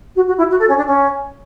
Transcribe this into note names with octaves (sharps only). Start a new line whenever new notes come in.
F#4
F#4
E4
F#4
A4
C#4
D4
C#4